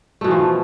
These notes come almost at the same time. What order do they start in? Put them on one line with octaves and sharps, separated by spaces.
A3 B2 E3 F3